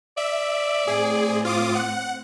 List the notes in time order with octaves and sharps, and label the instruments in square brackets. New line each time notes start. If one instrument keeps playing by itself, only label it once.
[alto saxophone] D5 [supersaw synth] E5
[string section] A2 C4 [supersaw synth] G#4
[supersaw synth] F4 D6 D#6
F#5